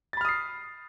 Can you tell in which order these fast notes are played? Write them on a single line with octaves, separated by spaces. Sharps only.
A6 B5 F6 D#6 C7